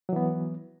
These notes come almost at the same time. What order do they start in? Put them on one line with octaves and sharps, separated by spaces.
F#3 E3 B3